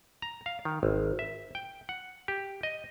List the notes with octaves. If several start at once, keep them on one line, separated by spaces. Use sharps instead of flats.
A#5
F5
D#3
G#1
E5
G5
F#5
G4
D#5